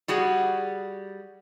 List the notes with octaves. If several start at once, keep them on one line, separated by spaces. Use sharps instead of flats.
G3 F#4 G#4 F#5